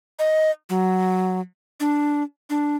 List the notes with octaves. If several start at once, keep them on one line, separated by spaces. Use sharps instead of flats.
D#5
F#3
D4
D4